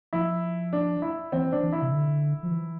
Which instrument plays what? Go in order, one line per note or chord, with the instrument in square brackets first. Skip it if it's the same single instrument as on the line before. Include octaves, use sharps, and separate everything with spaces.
[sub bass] F3 [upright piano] E4
[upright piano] D4
E4
[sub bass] E3 [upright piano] C4
[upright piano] D4
[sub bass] E3
[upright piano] E4
[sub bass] C3
D3
F3
E3